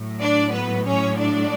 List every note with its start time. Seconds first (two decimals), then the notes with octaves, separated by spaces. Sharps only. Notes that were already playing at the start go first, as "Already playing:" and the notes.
Already playing: A2 F#3
0.21 D4 D5
0.53 B3 B4
0.86 C#4 C#5
1.18 D4 D5